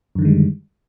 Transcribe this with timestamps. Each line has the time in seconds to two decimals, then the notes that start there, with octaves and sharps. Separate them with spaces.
0.15 F#2
0.19 D3
0.22 D#3
0.25 G#3
0.28 G3